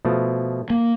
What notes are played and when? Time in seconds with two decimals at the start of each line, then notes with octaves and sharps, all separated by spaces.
0.05 B2 F3 A3
0.70 A#3